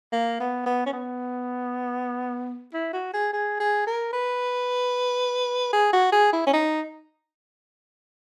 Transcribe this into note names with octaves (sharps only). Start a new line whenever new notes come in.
A#3
B3
B3
C#4
B3
E4
F#4
G#4
G#4
G#4
A#4
B4
G#4
F#4
G#4
E4
C#4
D#4